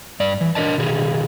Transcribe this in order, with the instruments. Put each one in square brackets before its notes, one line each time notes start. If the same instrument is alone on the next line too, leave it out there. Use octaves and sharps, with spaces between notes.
[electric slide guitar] G2 D5
E3
D4 A#4 D#5 A5
B2 D#3 G#4